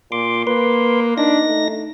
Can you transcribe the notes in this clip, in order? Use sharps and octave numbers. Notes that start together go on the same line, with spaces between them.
A#2 C6 D6
A#3 B4 C6
D4 D#4 A#6
A3